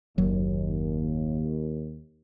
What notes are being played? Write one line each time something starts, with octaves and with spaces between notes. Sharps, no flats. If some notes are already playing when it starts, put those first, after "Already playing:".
F#1 D#2 F#3